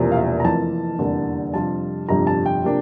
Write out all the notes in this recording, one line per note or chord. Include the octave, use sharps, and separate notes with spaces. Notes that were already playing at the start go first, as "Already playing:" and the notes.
Already playing: E1 E2 C3 F3 A#3
F5
E5
A#5
F1 F2 E3 A#3 F4 A5
F1 E2 D3 G3 A#3
F2 C3 G3 D4 F4 A5
G1 F2 C3 G3 D4 A#5
A5
G5
C3 F3 A#3 D4